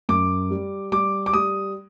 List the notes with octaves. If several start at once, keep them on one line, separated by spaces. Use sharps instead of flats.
F#2 D6
G3
G3 D6
D6
G3 D#6